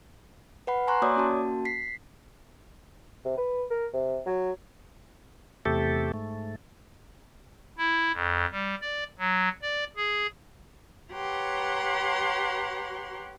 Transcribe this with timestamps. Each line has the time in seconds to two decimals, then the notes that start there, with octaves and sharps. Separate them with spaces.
0.67 B4 F#5 B5
0.87 G#5 A#5 C6 C#6 F#6
1.02 A#3 F#4 C#5 D5 D6 D#6
1.15 A#3 C#4 F#4 A5
1.65 B6 C7
3.25 C3
3.37 B4
3.70 A#4
3.93 C3
4.26 F#3
5.65 E2 C3 A3 G4 A4
6.14 G#2 A3
7.78 E4
8.13 F2
8.52 G3
8.81 D5
9.19 F#3
9.62 D5
9.96 G#4
11.12 G4 B4 C#5 F#5 A#5 C6